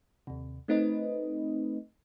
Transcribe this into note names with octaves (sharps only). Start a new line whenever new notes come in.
D#2 C3
A3 C4 D#4 B4 D#5